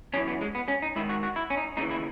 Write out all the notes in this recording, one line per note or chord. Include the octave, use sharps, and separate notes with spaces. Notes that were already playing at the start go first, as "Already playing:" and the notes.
F#2 E3 C#4
B3
G#3
B3
C#4
D#4
G#2 D#3 E4
F#4
F#4
E4
C#4
D#4
D#2 C#3 E3 D#4
E4